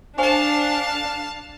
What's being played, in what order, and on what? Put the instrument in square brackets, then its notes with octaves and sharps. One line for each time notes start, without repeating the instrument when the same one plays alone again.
[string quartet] D4 [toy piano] C5 G#5 C#6 [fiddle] F5 A5